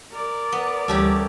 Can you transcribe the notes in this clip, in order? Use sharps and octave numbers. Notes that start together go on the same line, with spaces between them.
A#4 D5
B3
D2 E3 G3 A3 C#4 G4